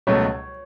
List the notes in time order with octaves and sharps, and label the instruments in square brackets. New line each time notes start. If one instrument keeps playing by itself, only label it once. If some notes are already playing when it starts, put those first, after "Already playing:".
[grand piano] C#2 B2 F#3 A3 [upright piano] C#5